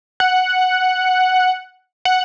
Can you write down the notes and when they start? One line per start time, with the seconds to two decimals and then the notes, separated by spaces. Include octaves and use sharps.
0.20 F#5
2.05 F#5